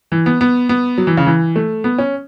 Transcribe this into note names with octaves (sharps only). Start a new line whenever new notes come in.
E3
B3
B3
B3
F#3
E3
C#3
E3
A3
B3
C#4